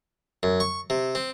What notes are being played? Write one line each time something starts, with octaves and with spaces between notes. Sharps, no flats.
F#2
C#6
C3
C4